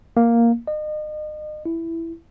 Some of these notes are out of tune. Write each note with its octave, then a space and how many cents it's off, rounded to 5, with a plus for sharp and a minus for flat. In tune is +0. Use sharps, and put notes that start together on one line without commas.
A#3 +0
D#5 -35
E4 +5